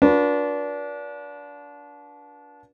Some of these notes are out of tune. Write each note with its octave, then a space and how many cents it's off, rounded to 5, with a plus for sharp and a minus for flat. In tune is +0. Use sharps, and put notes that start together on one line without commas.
D4 -25 F4 +45 B4 -40